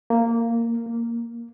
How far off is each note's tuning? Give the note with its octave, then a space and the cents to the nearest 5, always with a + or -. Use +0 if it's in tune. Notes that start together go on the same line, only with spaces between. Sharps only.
A#3 -10
A#3 +0